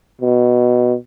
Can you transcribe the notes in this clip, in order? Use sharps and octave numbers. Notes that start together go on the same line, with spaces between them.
B2